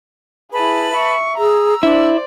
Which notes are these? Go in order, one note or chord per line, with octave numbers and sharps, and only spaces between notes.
E4 G#4 B4 A5 B5
E5 C#6
G#4 A#5 E6
D4 E4 C5 D5